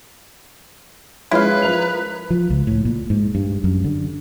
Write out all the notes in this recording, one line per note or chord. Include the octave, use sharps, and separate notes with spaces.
F3 G#3 C#4 E4 B4 F5
F3 A#4 F7
F3
C#2
A2
A#2
G#2
G2
F#2
D3